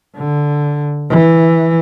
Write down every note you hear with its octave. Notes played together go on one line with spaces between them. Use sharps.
D3
E3